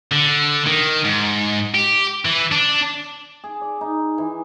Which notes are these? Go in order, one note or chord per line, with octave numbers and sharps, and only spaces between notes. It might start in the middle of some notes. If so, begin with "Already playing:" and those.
D3
D#3
G#2
G4
E3
D4
G#4
D5
D#4
E3